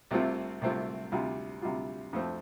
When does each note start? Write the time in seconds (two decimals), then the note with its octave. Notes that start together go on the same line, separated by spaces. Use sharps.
0.11 C2 C3 A3 C4 F4
0.61 C2 C3 A3 C4 F4
1.12 D2 C3 G3 F4
1.62 D2 C3 G3 F4
2.13 F2 F3 A3 C4